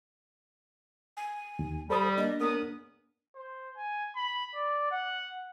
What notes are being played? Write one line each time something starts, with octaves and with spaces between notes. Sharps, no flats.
G#5
D#2
G3 A4 C5 B5 D#6
A#3 D4 D#5
C#2 B3 A#4 D#6
C5
G#5
B5
D5
F#5